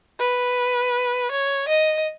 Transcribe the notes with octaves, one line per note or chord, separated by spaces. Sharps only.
B4
C#5
D#5